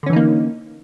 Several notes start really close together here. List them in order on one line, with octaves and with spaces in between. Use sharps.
D3 C#4 E3 D#4 A#3